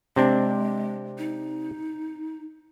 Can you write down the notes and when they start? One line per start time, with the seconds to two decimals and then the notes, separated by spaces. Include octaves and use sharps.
0.16 C3 G#3 C4 D4
1.18 D#4